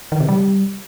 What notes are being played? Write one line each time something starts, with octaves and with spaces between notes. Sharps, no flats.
D#3
C3
G3